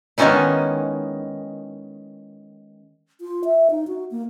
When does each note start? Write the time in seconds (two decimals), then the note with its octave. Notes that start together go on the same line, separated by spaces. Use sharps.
0.18 D#3 G#3 B3 C#4 D#4 E4
3.21 F4
3.44 E5
3.71 D#4
3.87 F#4
4.11 A#3